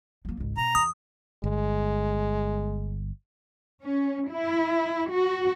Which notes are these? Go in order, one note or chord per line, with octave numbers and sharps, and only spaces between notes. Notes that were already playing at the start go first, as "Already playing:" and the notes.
F#3 A#3
G#1 C#2
B2 A#5
E2 D#6
G1 G#3
C#4
E4
F#4